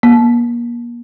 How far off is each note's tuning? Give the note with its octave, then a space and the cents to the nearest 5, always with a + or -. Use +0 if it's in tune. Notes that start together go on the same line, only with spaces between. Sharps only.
A#3 +35